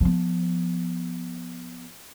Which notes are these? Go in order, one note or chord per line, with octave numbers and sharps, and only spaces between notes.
F3 B3